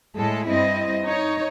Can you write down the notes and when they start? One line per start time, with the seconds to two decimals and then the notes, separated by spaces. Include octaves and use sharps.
0.15 A2 G#3 A4
0.47 G2 C4 E4 D#5
1.05 D#4 C#5